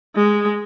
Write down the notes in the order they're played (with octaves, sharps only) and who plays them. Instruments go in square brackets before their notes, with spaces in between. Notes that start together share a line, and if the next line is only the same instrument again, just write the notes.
[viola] G#3